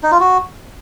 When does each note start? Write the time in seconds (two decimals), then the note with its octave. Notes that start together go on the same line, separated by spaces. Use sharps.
0.03 D#4
0.12 F4
0.20 F#4